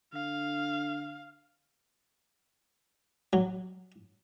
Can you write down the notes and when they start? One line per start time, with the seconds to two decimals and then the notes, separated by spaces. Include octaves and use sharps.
0.14 D3 F5
3.33 F#3